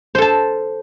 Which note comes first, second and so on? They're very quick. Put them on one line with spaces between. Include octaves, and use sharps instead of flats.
C5 A4 A5